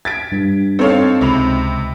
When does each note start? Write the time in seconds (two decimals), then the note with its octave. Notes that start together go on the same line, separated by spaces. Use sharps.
0.05 G#6 A6 B6 D7
0.32 G2
0.79 C4 D#4 A4 C5 C#5 F5
1.21 C#2 C3 B5 F7